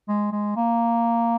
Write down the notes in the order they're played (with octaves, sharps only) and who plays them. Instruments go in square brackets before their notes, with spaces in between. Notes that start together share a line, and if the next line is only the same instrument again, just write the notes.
[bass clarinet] G#3
G#3
A#3